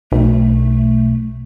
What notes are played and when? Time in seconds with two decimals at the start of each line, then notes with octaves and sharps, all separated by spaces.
0.12 B1 A3